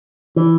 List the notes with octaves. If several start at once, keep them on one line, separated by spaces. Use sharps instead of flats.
E3